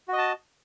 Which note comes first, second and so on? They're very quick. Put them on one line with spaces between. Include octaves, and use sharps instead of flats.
F#4 D#5 A5